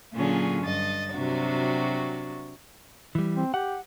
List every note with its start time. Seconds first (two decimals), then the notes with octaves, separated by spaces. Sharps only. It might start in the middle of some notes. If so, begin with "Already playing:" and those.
0.13 A#2 D3 F#3 C#4 F4 G#4
0.63 G2 D#5 A6
1.13 C3 F#3 D4 F#4
3.15 E3 G3
3.35 C4
3.54 G4 F#5